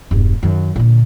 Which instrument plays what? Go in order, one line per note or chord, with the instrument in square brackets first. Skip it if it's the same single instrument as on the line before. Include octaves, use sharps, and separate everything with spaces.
[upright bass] E1 G2
F#2 D#3
A#2 D3